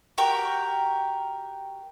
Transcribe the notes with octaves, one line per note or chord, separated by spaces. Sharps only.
F#4 G4 A#4 G5